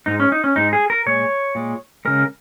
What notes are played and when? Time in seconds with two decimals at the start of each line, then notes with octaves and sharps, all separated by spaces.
0.06 G#2 G#3 D#4
0.20 C#4
0.32 D#4
0.44 C#4
0.56 G#2 G#3 D#4
0.73 G#4
0.90 A#4
1.06 A#2 G#3 C#5
1.55 A#2 G#3
2.05 C#3 G#3 A#4